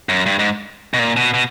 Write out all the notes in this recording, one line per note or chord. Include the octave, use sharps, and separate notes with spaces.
F#2
G2
G#2
B2
A#2
B2
B2